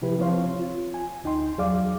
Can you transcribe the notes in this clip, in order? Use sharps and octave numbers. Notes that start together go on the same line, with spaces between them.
C3 F3 E4 G4 B4
F3 C4 C#5 F5 C6
F4
G#5
D2 D#4 G5 C6
E2 F#3 G#4 D5 F5 D6